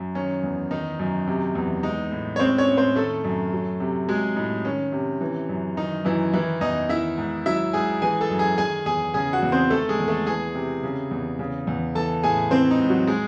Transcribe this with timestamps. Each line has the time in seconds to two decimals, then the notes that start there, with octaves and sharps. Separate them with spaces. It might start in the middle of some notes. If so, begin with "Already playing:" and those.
Already playing: F#2
0.15 D#3 C#4
0.43 E2
0.71 D#3 D#4
0.99 F#2
1.27 C3
1.55 E2
1.83 G#3 D#4
2.12 A2
2.36 C#5
2.40 G#3 C4 C5
2.58 C#4 C#5
2.68 A2
2.77 C4 C5
2.96 D#3 A3 A4
3.24 F#2
3.53 F#3
3.80 C3
4.08 F#3 G#3 G#4
4.36 A2 D#4
4.65 D#3 C#4
4.92 C3
5.21 E3
5.49 F#2
5.77 D#3 D#4
6.05 F#2 E3 E4
6.33 D#3 E3 E4
6.61 E2 D#4 D#5
6.89 D#3 E4 E5
7.18 G#2
7.46 F#3 E4 E5
7.73 G#2 G#4 G#5
8.02 E3 G#4 G#5
8.21 A4 A5
8.30 F#2
8.39 G#4 G#5
8.58 D#3 G#4 G#5
8.86 E2 G#4 G#5
9.14 C#3 G#4 G#5
9.33 F#4 F#5
9.42 E2
9.52 C4 C5
9.70 D#3 A3 A4
9.89 G#3 G#4
9.99 E2
10.08 A3 A4
10.27 E3 G#4 G#5
10.55 C3
10.83 C#3
11.11 E2
11.39 C#3
11.67 E2
11.95 E3 A4 A5
12.23 A2 G#4 G#5
12.51 E3 C4 C5
12.71 D#4
12.79 G#2
12.89 F#3 F#4
13.07 G#3 G#4